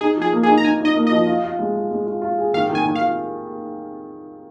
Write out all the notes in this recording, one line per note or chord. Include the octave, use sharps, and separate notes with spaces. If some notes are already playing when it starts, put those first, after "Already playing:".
D#4 G#4
F3 G#4
A#3
G#4
D#4
A#5
D#4 G#5
D#4 D#5
A#3
D#5
F3
F4
F4
G#3
F4
G#3
F4
F4
G#4
D#3 F5
D#3
G#5
D#3
F5
F4